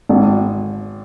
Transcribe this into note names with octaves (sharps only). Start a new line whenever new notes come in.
G#1